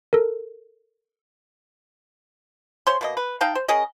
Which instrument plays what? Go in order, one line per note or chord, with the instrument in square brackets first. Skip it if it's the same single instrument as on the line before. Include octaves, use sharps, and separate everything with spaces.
[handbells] A4 A#4
[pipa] C#3 C5 C#5 C6
B2 A#3 D#5
B4
D#4 F5 G5 A5
C5
C#4 G#4 A#4 D#5